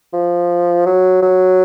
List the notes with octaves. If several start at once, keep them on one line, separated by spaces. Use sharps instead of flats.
F3
F#3
F#3